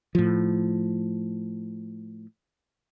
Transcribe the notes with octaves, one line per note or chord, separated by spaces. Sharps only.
A2 F3